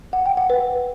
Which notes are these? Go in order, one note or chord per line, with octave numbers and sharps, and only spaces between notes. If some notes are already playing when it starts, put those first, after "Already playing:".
F#5
G5
F#5
B4